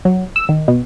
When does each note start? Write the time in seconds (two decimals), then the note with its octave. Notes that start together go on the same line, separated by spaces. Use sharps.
0.05 F#3
0.36 E6
0.49 D#3
0.68 B2